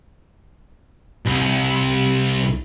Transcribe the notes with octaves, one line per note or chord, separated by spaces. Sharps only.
C2